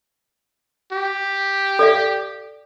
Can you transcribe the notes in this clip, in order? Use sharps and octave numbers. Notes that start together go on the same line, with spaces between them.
G4
A4 D5 F5